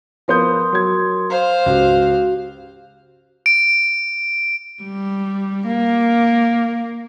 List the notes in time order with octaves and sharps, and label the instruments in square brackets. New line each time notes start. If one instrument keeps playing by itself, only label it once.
[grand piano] F3 B3 G6 [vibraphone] A#4 C6 D#6
[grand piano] F#3 G#6
[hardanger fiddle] C5 F5
[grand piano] C#2 [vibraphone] F#4 G4
[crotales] D7
[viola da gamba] G3
A#3